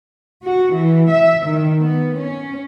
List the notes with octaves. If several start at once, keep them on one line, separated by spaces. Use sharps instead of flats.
F#4
E3
E5
D#3
B3
C#4